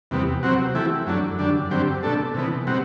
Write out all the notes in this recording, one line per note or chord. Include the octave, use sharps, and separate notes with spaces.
E2 C3 G3 B3
C3 F#3 C4 F#4
E3 A3 E4 G4
F#2 F#3 A3 D4
F#2 D3 G3 D4
G2 D3 F#3 C4 G4
B2 A3 D4 A4
C3 E3 B3
B2 G3 C4 F#4